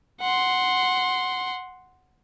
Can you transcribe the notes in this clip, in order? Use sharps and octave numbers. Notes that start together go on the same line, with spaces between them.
F#5 C6